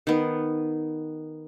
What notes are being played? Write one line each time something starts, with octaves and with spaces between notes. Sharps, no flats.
D#3 B3